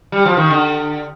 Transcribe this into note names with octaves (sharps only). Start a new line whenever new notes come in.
G3
F3
D#3
D3